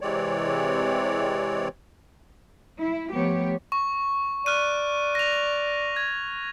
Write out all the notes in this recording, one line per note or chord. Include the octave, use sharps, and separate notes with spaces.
C3 E3 G#3 C4 C#5 D5
E4
F3 A3 B3 G4 C#5
C#6
D5 F6 F#6 D#7
A#6 F7
G#6